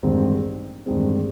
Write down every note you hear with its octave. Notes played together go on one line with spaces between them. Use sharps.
A1 G2 D#3 G#3 C4
A1 G2 D#3 G#3 C4